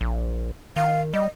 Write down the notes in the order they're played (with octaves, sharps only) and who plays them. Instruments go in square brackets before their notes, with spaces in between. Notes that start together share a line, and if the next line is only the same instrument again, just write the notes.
[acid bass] A#1
[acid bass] D#3 [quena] F5
[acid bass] G3 [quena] D#5